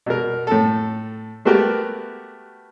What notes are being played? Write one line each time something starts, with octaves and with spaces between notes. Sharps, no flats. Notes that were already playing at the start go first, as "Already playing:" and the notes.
B2 A#4
A2 A4
A3 B3 F#4 G4 A#4